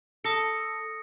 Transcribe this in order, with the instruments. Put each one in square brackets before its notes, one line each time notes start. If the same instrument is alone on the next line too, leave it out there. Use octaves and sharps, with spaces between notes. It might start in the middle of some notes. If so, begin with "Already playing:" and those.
[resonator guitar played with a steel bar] A4 [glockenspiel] D#6 A#6 C#7